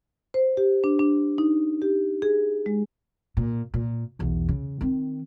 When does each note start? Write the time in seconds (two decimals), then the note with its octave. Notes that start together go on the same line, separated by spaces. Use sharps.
0.34 C5
0.57 G4
0.84 D4
0.99 D4
1.38 D#4
1.82 G4
2.22 G#4
2.66 G#3
3.37 A#2
3.74 A#2
4.19 B1 E2
4.49 C#3
4.81 D#3 C4